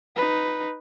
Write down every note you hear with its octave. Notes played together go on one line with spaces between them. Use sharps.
D#4 B4